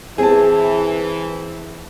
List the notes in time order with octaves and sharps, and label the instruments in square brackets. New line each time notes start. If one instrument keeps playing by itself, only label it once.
[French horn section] E3 [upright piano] C4 A5 [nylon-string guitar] G#4